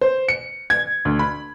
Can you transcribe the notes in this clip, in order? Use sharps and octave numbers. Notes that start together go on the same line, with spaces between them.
C5
C#7
G#6
D2
B5